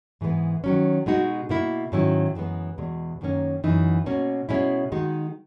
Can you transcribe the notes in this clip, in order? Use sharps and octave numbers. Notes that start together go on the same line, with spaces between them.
G#2 E3 G#3 B3
D#3 F#3 C#4
B2 G#3 D#4 F#4
B2 A#3 E4
G#2 D#3 F#3 C#4 E4
F#2 E3 G#3 B3
E2 B2 G#3
F#2 D#3 A#3 C#4
F#2 E3 B3 D#4
B2 A#3 C#4
B2 G#3 C#4 E4
D#3 G#3 D#4 F#4